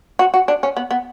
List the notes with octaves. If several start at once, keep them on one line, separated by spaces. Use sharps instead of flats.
F#4
F#4
D4
C#4
B3
B3